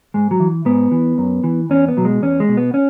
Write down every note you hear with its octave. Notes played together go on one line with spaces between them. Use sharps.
G#2 G#3
F#3
E3
G#2 B3
E3
F#2
E3
E2 C#4
B3
B2 F#3
G#3
E2 C#4
G#3
B2
B3
C#4